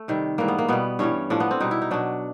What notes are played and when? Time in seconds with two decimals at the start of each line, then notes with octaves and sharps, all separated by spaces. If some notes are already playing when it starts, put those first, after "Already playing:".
Already playing: A3
0.08 C3 D#3 G3
0.38 G#2 E3 G3 A#3
0.48 B3
0.58 A#3
0.68 B2 G3 B3
0.99 G2 E3 G3 C#4
1.30 A2 F3 D4
1.40 B3
1.51 C4
1.60 B2 G3 D#4
1.71 E4
1.82 D#4
1.91 B2 F#3 D4